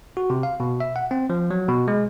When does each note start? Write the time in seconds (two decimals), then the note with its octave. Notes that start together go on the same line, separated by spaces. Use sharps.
0.17 F#4
0.30 C3
0.43 F5
0.60 B2
0.80 E5
0.96 F#5
1.11 C4
1.30 F3
1.51 F#3
1.69 B2
1.88 G#3